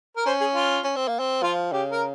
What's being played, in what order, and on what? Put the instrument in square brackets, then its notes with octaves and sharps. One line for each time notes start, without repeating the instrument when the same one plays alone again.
[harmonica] A#4
[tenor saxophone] C#4 [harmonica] C5
[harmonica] G#4
F4
[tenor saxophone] C#4
C4
A#3
C4
[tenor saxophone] F3 [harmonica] F4
[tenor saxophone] C#3 [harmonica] G4
[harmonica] A#4